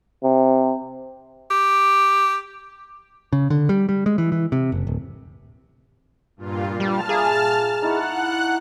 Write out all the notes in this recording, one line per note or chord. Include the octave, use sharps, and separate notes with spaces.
C3
G4
C#3
D3
G3
G3
G#3
E3
E3
C3
F#1
D1
G2 A#2 F4
G3 A5 F6
A#3 G#4 E5 B5
D#4 E4 F#5 C#6 F#6